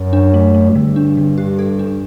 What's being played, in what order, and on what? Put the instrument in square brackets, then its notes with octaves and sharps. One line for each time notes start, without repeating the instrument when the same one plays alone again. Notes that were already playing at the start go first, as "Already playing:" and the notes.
Already playing: [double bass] F#2
[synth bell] D4
A3
A3
[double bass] G2 [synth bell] D3
[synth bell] D4
D3
G4
A4
D4